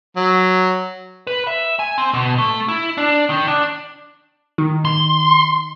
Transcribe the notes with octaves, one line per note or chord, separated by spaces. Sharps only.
F#3
B4
E5
G#5
C4
B2
A3
E4
D4
D#3
D4
D#3
C6